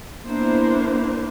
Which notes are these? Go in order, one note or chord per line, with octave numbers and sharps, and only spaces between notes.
A#3 B3 D4 E4 A#4 C5